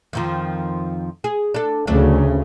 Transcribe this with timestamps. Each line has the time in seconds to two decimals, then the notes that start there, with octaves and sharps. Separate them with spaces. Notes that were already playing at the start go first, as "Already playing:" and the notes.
0.13 F2 D#3 F3
1.24 G#4
1.54 D4 A4
1.87 D2 C#3 F#3 A3 D4